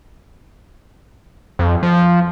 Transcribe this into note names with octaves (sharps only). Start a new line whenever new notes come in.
F2
F3